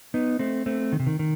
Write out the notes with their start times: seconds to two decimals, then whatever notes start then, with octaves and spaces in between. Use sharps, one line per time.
0.14 B3 D#4
0.39 A3 C4
0.66 A3 C4
0.92 D#3
1.00 C3
1.07 D#3
1.19 D#3